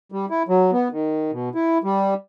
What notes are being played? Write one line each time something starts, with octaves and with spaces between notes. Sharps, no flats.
G3
E4
F#3
B3
D#3
B2
E4
G3